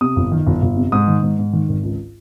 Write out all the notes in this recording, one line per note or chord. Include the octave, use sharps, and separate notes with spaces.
C3 D#6
G1
D#3
G1
G1
C3
G#2 D#6
D#3
G#2
G#2
D#3
G#1
C#2